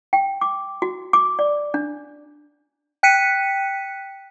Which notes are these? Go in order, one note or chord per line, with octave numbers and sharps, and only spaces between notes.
G5
D6
F#4
D6
D5
D4
G5 F#6 B6 C#7 D#7